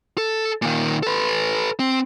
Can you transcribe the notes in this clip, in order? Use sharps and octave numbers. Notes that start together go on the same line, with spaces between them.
A4
A#2 D#3
A4 B4
C4